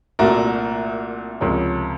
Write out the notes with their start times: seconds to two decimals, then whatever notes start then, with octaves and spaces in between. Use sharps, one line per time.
0.19 C2 A#2 A3 F#4 A#4
1.41 C#2 C3 F3 A#4 C#5